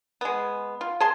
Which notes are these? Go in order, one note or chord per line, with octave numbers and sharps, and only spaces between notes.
G#3 B3
F4
G#4 A5 C6